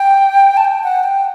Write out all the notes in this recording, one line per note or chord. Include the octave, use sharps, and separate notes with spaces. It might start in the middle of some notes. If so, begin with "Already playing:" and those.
Already playing: G5
A5
G5
F#5
G5